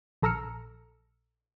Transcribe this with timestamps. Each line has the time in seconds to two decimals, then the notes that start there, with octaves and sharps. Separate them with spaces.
0.22 A#1 A4 A#5 E6 F6 C#7